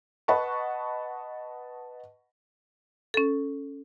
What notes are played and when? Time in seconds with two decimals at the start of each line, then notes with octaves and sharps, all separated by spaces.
0.28 B4 D#5 F#5 A5 B5 C#6
3.14 C#4 A4